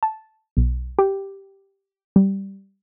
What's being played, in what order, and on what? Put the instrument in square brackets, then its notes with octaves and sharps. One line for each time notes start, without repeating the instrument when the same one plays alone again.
[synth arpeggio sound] A5
B1
G4
G3